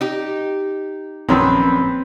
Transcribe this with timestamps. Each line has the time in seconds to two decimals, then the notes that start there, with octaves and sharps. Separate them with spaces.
0.01 D#4 G4
1.29 A#1 F#2 D#3 F#3 C4 C#4 B4 A5